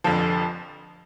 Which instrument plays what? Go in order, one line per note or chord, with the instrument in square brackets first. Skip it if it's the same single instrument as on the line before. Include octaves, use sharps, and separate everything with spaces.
[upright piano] F1 F2 D3 F3